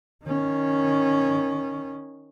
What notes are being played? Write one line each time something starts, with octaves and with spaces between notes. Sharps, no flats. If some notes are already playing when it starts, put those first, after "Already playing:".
D#3 C#4